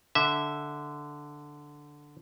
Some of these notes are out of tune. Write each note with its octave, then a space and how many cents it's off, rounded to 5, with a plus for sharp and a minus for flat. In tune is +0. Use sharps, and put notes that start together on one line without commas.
D3 +0 E5 -15